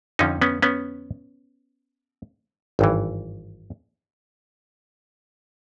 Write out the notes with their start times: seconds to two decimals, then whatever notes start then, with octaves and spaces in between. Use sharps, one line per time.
0.19 F2 D3 F3 C#4 D#4
0.42 B3 C#4
0.62 B3 C#4
2.79 G#1 G2 E3